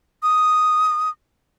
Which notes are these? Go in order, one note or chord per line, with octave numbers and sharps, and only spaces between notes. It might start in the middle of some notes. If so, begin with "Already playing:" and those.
D#6